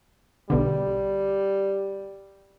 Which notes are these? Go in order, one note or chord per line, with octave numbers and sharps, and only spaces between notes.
B1 B2 D3 G3